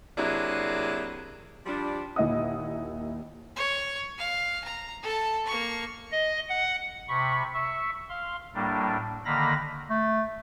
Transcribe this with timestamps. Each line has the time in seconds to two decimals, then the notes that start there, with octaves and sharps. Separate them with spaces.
0.17 C3 F#3 A#3 D4 E4 G#4
1.66 F3 G3 D4
2.16 D#2 A#2 E4 D#5 F#5 D#6
3.56 C#5
4.18 F5
4.64 A#5
5.03 A4 A5
5.46 A#3 C#6
6.12 D#5
6.49 F#5
7.08 C3 B5 C#6
7.54 E5 C#6
8.09 F5 C6
8.54 A2 G3 A#3 D4
9.25 D3 D#3 A#3 F5 B5 A#6
9.91 A3